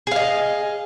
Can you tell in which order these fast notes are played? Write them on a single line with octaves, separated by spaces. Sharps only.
G#4 F5 D#5